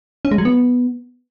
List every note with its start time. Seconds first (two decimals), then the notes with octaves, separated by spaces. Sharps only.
0.25 C#4
0.31 G#3
0.38 F#3
0.45 B3